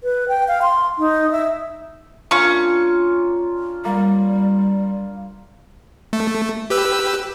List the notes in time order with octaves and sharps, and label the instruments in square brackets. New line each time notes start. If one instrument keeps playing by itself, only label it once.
[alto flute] B4
G5
F5
C6
D#4
E5
[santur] A#3 D4 F4 [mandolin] C#4 C#6
[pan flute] G3 [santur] A#3
[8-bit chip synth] A3
G4 B4 E6